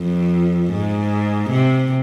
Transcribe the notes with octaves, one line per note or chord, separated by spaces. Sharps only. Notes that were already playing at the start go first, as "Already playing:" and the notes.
Already playing: F2
G#2
C3